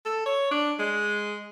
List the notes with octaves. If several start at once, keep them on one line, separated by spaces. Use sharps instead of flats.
A4
C#5
D4
G#3